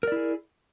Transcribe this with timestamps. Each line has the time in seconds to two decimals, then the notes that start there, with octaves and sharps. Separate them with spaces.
0.03 A#4
0.07 D5
0.12 E4
0.16 G#4